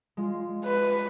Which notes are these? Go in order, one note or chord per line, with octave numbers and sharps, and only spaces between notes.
G#3 F4
B4